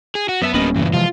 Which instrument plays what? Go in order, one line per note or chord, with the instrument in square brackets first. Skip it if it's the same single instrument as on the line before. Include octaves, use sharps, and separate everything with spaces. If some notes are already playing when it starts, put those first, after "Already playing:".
[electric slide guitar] G#4
F#4
[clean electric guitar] F#2 E5 A5 [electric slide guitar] B3
[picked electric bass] D1 A#3 C#4 [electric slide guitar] G3 B3 [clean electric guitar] A#4 D#5 B5
[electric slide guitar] G2 A#2 C#3 [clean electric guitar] E3
[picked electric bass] C3 F3 G#3 [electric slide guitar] F4